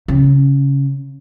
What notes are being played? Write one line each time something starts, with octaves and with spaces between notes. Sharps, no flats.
C#3